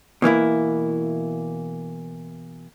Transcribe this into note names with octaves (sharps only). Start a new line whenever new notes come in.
B2 E3 A#3 E4